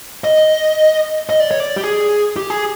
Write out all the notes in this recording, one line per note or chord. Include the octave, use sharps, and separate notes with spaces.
D#5
D#5
D5
C#5
D5
G4
G#4
G4
G#4